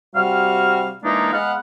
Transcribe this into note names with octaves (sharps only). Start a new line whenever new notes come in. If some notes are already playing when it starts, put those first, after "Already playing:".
C3 G3 F#4 F5 F6
E3 G#3 A#3 D4 D#4
G#3 B3 F5 F#5